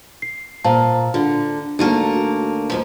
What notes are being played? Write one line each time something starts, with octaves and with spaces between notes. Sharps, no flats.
C7
A#2 C5 F5 A5
D3 F4
D2 A3 A#3 D#4 F#4
F#4
D#2 G#2 F3